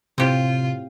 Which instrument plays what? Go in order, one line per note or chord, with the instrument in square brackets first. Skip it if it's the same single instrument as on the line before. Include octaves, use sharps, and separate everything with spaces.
[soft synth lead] A2 [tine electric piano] C3 [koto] C4 G4 [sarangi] F4